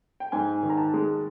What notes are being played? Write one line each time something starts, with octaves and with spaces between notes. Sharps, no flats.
G5
G#2 G#5
D#3
A#5
A5
G#3